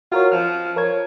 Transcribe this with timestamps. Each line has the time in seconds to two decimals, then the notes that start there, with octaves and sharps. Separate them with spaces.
0.12 F4 F#4 A#4 C#5
0.32 F3 F6
0.76 F3 A#4 C#5 G#6